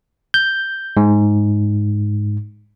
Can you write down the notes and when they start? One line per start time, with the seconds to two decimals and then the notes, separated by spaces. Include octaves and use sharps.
0.34 G6
0.97 G#2